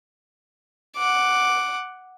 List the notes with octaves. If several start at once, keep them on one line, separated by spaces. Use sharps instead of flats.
F#5 D6